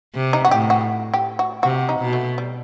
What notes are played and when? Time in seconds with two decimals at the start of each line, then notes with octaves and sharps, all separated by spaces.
0.15 C3
0.33 D#4
0.45 F#4
0.51 A2 G4
0.70 F#4
1.14 G4
1.39 F#4
1.63 C3 F#4
1.89 D#4
2.01 B2
2.13 A3
2.38 G3